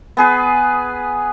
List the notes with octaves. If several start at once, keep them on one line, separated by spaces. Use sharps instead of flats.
B3 G#4 B4